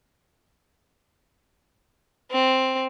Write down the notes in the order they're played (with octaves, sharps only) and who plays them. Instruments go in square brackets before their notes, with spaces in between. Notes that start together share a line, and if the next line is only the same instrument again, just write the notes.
[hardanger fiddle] C4